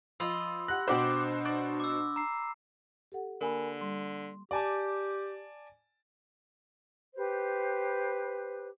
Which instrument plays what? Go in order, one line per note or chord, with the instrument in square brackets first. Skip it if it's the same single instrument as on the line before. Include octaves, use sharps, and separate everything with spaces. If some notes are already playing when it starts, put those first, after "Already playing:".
[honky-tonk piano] F3 [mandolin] F4 D#5 [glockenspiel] B5 C6 E6
[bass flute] G4 [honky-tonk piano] F#5 F#6 [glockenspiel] A#6
[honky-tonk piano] B2 F#4 C5 [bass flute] D4 [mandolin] G4 D5 D6
[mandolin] D5 F#5 C#6
[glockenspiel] D6 E6
A#5 C7
[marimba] G4 A4 F#5
[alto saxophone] D3 [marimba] A#3 [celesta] A#4 G#5 B5
[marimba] G3 [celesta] C6
[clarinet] G4 [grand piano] D5 G#5 A5
[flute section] G4 B4 C5